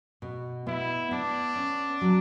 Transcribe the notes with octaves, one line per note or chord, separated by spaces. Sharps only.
B2
B3 E4
B3 D4
C#4
F#3